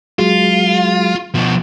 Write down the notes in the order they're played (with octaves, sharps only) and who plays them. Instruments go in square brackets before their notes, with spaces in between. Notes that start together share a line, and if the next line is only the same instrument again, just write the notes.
[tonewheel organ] F#3 G#3 [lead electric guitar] F4
[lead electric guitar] B2 F3